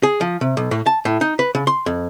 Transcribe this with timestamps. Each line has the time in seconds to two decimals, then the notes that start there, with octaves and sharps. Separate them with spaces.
0.03 G#4
0.21 F3
0.41 C3
0.57 B1
0.71 A2
0.86 A5
1.05 A2
1.21 D#4
1.39 B4
1.55 C#3
1.67 C6
1.86 F2